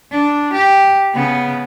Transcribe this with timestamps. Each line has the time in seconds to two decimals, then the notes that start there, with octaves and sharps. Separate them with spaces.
0.12 D4
0.54 G4
1.14 C#3 B3